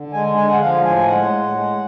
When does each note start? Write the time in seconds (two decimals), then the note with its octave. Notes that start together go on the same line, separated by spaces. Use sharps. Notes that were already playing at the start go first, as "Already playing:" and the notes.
Already playing: D3
0.13 G#3 G#5
0.36 D3 G#5
0.48 F#5
0.60 F3 F5
0.84 A2 G#5
1.06 G#3 F#5
1.30 A2
1.54 G#3